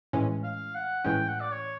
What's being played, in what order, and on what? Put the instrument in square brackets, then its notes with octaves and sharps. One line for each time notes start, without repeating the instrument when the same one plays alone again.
[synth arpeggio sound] A2 E3 G#3 C#4
[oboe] F5
F#5
[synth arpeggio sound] A2 E3 G#3 C#4 [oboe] G5
[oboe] F#5
D5
C#5